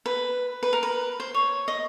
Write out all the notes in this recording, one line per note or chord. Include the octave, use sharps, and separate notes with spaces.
B4
B4
A#4
B4
C5
C#5
D#5